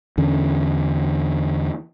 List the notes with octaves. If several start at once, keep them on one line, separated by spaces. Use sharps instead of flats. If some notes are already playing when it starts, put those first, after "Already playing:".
E2 D3 C#4